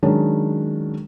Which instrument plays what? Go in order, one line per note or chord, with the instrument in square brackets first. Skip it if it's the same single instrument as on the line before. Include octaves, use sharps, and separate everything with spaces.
[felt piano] D#3 F#3 G#3 C#4 D4